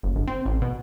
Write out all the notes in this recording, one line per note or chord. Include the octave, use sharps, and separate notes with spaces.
F#1
G1
C4
A1
B2